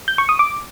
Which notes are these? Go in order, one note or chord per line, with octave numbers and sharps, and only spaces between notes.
G6
C#6
D#6
D6